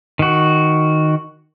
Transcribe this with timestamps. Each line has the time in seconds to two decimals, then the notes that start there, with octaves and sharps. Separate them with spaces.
0.19 D#3 F#4